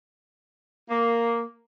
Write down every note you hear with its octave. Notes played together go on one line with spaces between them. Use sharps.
A#3